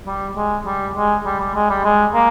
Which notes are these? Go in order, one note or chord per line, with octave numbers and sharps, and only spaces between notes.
G3
G#3
G3
G#3
G3
G3
G#3
G3
G#3
A#3